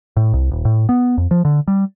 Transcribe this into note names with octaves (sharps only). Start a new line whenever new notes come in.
A2
C2
D#1
A2
B3
F2
F3
D3
G3